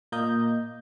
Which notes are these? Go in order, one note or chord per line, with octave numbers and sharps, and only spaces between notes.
A#2 A#3 A#4 D#5 G6